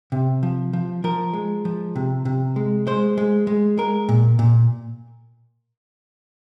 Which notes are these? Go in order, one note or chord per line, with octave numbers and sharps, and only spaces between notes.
C3
F3
F3
F3 A#4
G#3
F3
C3
C3
G#3
G#3 C5
G#3
G#3
G#3 A#4
A#2
A#2